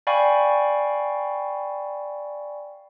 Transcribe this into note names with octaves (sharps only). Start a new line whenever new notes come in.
D5 F5 G5 G#5 B5 C#6